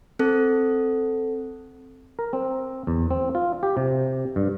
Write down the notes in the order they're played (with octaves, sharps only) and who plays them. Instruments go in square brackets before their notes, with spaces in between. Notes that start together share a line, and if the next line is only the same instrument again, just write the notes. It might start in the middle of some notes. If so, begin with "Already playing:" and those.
[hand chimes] C4 A4
[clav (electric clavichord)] A#4
C4
E2
C4
F4
G4
C3
G2